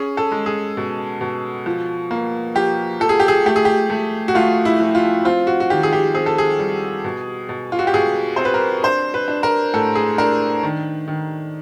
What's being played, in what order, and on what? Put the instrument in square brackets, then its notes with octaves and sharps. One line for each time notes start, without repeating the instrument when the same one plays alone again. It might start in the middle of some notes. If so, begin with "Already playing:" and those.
Already playing: [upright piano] C#4 G#4
A4
G#3
G#4
B2
B2
F3
A#3
F3 G4
F3 A4
G#4
G4
G#4
A3 G4
G#4
G4
A3
F#4
A3 F4
E4
F3
F4
C4 F4
F#4
F#4
D#3 G4
G#4
G4
C4 G#4
A4
G#4
G3
B2
B2
F4
F#4
G4
B2 G#4
C4 C5
B4
A#4
D4 C5
B4
D4
A#4
A2 A4
G#4
D4 A#4
D#3
D#3